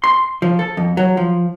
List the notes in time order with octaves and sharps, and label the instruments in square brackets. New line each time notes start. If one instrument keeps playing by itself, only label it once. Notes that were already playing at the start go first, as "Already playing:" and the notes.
[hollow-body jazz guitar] C6
F3
A4
F2
F#3
F3